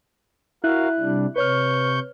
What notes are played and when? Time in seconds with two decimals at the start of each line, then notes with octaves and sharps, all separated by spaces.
0.64 E4 F#4 A#4 E5 F5 F#6
1.00 C3 G3 D4
1.36 C3 B4 C#5 C#6 F6 G6